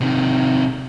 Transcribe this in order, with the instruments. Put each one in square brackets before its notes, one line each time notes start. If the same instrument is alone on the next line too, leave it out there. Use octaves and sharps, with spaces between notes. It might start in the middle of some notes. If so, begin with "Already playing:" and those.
[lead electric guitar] C3 D#3